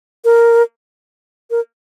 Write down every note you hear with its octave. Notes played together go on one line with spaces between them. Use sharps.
A#4
A#4